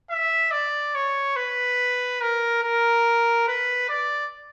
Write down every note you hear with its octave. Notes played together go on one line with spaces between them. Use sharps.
E5
D5
C#5
B4
A#4
A#4
B4
D5